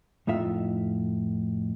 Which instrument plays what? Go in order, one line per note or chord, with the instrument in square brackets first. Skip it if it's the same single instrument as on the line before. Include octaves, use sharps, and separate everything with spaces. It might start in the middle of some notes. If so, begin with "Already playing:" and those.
[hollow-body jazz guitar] F2 A2 D#4 F4 E5